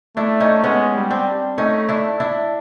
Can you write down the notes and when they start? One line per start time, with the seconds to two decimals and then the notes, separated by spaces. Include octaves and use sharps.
0.17 A3 D4 E4
0.40 C#4 D#4
0.64 G#3 B3 C#4
0.95 G3
1.10 C4 D4
1.58 A3 C#4 D#4
1.89 D4 E4
2.20 D4 E4